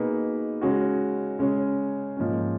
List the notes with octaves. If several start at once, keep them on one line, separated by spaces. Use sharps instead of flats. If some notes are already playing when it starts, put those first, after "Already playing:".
Already playing: B2 A#3 D#4 G#4 B4
C#3 G#3 C#4 F#4
C#3 G#3 C#4
G#2 F3 A#3 C#4